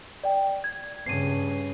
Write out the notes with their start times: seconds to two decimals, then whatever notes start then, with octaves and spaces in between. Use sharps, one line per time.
0.24 D5 G5
0.64 G#6
1.06 G2 C#3 C7 D#7